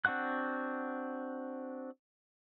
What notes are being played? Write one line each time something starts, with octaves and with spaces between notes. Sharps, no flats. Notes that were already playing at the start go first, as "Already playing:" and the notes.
C4 D4 F#4 F#5 F#6